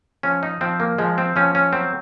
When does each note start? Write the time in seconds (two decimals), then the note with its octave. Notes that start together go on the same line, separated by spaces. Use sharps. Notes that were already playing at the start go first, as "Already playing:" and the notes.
0.23 F3 C#4
0.43 D#4
0.61 F3 C4
0.80 A#3
0.98 F3 G#3
1.18 C4
1.36 F3 C#4
1.55 C#4
1.73 F#3 C4